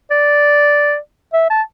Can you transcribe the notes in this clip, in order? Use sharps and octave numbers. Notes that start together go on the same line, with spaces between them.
D5
E5
A5